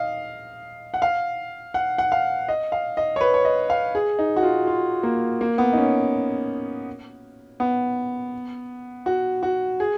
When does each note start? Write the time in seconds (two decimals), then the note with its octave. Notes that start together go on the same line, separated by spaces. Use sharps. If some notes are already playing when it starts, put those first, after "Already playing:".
Already playing: D#5 F5
0.94 F#5
1.02 F5
1.74 F#5
1.98 F#5
2.12 F5
2.48 D#5
2.72 F5
2.97 D#5
3.16 C#5
3.21 B4
3.34 C#5
3.45 D#5
3.70 F5
3.95 G#4
4.19 D#4
4.36 F#4
4.43 F4
4.67 F4
5.03 A#3
5.41 A#3
5.58 B3
5.73 D#4
5.77 C#4
7.60 B3
9.06 F#4
9.43 F#4
9.80 G#4